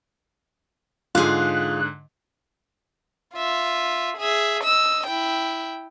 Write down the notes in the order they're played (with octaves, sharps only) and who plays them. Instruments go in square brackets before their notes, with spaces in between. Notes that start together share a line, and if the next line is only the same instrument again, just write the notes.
[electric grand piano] G#2 D3 [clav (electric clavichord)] F4 [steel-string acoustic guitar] G#4 F5 [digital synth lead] F#6
[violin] F4 E5
G#4 E5
D#5 E6
E4 G5